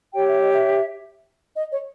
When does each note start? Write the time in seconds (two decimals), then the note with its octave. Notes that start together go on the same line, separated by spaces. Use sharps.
0.14 G4 C#5 G5
0.27 E5
0.41 D#5
0.54 E5
1.56 D#5
1.72 C#5